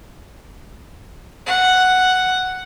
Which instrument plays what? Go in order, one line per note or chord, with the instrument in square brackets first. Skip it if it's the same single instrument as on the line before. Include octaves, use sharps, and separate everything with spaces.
[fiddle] F#5